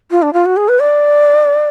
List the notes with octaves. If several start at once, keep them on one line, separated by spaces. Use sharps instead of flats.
F4
D4
F4
F#4
G#4
B4
D5